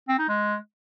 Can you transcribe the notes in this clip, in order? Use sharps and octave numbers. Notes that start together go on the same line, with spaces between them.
C4
D#4
G#3